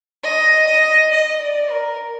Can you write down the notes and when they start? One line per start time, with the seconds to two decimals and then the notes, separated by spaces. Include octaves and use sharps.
0.24 D#5
0.67 D#5
1.11 D#5
1.41 D5
1.70 A#4